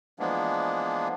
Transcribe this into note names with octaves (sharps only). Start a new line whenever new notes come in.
E3 F3 G#3 A#3 B3 D4